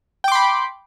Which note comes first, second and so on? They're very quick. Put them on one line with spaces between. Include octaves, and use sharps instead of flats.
G5 D6 C6 B5